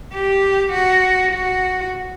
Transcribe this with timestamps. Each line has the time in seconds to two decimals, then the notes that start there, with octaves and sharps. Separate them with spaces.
0.14 G4
0.73 F#4
1.32 F#4